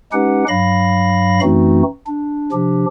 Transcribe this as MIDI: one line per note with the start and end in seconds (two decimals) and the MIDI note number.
0.12 0.44 56
0.12 0.44 61
0.12 0.44 63
0.12 0.44 67
0.12 0.44 71
0.12 0.44 78
0.48 1.40 43
0.48 1.40 54
0.48 1.40 77
0.48 1.40 83
0.48 1.40 94
1.42 1.82 42
1.42 1.82 52
1.42 1.82 57
1.42 1.82 60
1.42 1.82 63
1.42 1.82 66
2.06 2.50 62
2.52 2.85 48
2.52 2.85 53
2.52 2.85 62
2.52 2.85 67